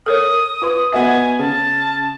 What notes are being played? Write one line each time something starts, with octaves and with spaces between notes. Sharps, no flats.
A4 A#4 C#5 D#6
F4 B4 C6
B3 F#4 D#5 E5 G#5
C#3 A5